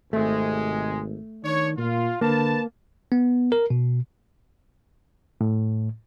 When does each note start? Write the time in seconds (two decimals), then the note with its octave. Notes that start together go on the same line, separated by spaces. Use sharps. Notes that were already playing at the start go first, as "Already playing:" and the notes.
0.13 G#1 C3 G#3 A3
1.44 D#3 D4 C#5
1.78 A#2 F4
2.21 D3 A#3 B4 A5
3.12 B3
3.52 A#4
3.70 B2
5.41 A2